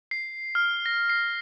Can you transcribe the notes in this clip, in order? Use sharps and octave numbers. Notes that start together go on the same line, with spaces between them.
C7
F6
A#6
C7